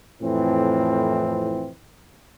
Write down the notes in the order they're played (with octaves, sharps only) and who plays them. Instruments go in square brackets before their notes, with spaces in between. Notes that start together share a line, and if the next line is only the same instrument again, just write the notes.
[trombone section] F2 A2 E3 C4